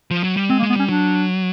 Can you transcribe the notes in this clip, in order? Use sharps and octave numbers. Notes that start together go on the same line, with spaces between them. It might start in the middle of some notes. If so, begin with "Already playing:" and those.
F3
F#3
G3
G#3 C4
A#3
G#3
B3
G3 C#4
F#3 D4